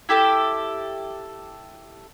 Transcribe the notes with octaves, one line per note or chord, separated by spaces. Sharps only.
E4 G4 A4 A5